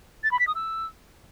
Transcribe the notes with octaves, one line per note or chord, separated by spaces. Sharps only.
A6
B5
B6
D#6
E6